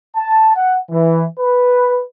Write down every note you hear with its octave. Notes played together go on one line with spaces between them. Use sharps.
A5
F#5
E3
B4